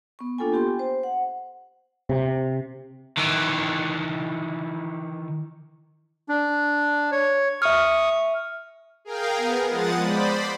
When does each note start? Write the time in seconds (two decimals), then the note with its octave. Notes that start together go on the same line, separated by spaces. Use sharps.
0.19 B3 C#6
0.38 A#3 D4 F4 A4 G5 G#5
0.53 B3 G4 G5 C6
0.79 C5
1.03 F#5
2.09 C3
3.17 D#3 E3
6.29 D4
7.12 C#5
7.62 E5 C#6 D#6 F6
9.05 G#4 A#4 F5 G5
9.36 B3 G#4 A#4
9.69 F3 G#3 F#5 D#6 A6
10.02 C5 D5 B5